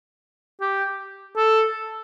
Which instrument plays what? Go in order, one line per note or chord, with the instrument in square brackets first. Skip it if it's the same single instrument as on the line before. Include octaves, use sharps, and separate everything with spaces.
[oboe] G4
A4